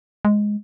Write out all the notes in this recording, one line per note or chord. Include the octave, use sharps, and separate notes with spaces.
G#3